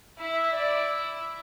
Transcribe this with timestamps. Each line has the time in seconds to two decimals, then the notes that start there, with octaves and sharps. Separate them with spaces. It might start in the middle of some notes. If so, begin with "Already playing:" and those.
0.19 E4 E5
0.52 D5